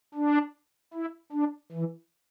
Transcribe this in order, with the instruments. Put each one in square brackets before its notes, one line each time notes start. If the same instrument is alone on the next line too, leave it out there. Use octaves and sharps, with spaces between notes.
[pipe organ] D4
E4
D4
E3